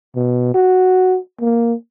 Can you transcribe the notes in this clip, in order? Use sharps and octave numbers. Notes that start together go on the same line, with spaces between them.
B2
F#4
A#3